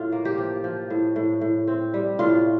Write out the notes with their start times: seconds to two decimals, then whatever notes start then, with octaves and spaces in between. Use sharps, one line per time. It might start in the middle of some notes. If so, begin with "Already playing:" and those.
Already playing: A2 F4
0.12 A#3
0.25 G4
0.38 F3
0.64 F3
0.90 A2
1.16 A2
1.41 A2
1.68 C4
1.94 G3
2.19 A2 F4